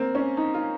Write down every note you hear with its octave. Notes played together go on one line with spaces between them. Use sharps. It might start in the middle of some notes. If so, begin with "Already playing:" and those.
Already playing: A#3 C4
C#4
D#4
F4